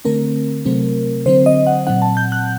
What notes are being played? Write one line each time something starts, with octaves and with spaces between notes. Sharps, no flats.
D3 A3 C4 A#4
C3 F#3 A3 C4
D3 F#3 C4 C5
D#5
F#5
A#2 F#3 C4 F#5
A5
G6
F#6